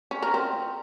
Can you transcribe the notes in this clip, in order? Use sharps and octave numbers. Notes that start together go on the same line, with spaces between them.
C#4
A#4
C4